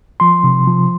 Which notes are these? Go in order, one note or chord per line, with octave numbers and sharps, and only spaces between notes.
F3 C6
C3
F3